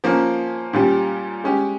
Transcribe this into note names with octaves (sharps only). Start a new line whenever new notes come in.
F3 A#3 C#4
A#2 G3 C#4 G4
G#3 C#4 G4